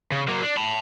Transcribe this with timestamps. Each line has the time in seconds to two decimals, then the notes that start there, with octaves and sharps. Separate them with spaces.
0.12 C#3
0.28 F#3 A#3
0.43 D4
0.57 A5 B5